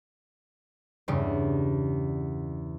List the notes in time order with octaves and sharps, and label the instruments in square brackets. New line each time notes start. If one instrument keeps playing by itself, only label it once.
[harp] E2 G2 C#3 G3